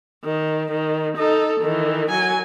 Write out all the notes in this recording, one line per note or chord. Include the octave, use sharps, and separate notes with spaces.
D#3
D#3
D#4 A4
D#3 E3
F#3 G#5